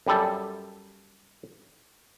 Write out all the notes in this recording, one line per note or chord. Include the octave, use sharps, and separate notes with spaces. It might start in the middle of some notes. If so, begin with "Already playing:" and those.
F#2 G3 A4